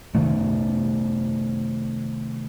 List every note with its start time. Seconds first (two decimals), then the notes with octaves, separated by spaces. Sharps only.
0.15 C3 D#3 A3